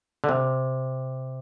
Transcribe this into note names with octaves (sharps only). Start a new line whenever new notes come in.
D3
C3